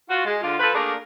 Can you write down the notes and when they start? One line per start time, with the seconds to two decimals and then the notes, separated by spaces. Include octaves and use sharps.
0.10 F4 F#4
0.26 G#3
0.42 D3 F4
0.60 F3 A4 B4
0.74 A3 A#3 D4 G#4 A#4